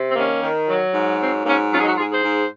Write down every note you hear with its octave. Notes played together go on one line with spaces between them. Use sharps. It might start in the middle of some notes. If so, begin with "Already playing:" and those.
Already playing: C3
C4
D#3 A#3 C#4
D#3
F#3
G#2
F#3 C4
G#2 A#3 C#4
F#3 C#4 F4
G#4
D#4 F#4
G#2 F4 G#4
G#4 C5
G#2